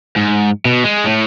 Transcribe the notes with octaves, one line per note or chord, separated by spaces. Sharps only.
G#2
B2
G#3
A2